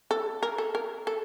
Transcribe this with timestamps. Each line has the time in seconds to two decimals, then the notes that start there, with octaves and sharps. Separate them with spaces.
0.11 A4
0.43 A#4
0.58 A4
0.75 A#4
1.07 A4